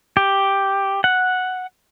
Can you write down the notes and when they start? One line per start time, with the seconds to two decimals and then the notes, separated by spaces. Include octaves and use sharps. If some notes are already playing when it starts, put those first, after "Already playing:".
0.17 G4
1.04 F#5